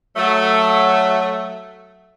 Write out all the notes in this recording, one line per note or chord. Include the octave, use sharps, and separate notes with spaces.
F#3 A3